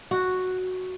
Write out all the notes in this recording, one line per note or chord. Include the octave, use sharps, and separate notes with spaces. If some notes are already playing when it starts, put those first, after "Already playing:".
F#4